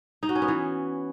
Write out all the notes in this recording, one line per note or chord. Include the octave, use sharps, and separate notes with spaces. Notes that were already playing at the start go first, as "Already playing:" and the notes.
D#4
F#4
C#4
B3
E3